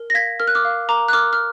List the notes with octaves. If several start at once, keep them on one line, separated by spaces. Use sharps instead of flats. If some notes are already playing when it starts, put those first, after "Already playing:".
Already playing: A#4
A#6
F5 G#6 B6
A#4 F6
F#6
D6 F6
F5
A#4 A#5 D6
F#6
A#4 D6 F6
F6